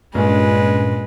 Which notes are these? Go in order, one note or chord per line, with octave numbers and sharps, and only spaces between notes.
G2 A#2 G#3 C#4 B4